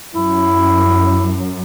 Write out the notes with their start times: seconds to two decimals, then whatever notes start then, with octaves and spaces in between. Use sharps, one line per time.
0.15 F#2 E4